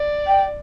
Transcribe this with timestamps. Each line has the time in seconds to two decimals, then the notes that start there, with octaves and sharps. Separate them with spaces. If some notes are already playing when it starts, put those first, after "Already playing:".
Already playing: D5
0.27 G5